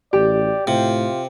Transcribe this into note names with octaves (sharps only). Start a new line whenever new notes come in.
A1 G4 D5
A2 C3 F4